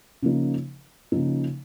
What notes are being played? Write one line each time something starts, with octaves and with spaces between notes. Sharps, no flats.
C#3 F3 A#3 D#4
C#3 F3 A#3 D#4